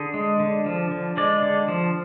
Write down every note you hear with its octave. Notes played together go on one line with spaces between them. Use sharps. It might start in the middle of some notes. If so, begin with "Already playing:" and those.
Already playing: D3 G#4
G#3
D3
F3
D3
G#3 D5
D3
F3